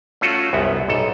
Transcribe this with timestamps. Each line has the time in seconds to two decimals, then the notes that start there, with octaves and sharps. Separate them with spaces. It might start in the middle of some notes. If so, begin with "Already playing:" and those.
0.21 A3 C#4 F4 F#4 A4
0.53 C2 F#2 B3
0.88 B1 G#2 A4